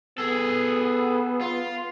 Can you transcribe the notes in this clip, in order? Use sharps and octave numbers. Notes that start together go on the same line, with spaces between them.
B3 G#4 A4
F4